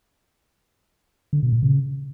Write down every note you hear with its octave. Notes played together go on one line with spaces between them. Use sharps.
D3
B2
A#2
C#3